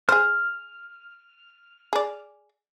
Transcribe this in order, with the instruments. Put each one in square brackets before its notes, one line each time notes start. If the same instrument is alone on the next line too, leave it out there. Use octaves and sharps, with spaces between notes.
[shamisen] G#4 C5 [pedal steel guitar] F6
[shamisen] G#4 D5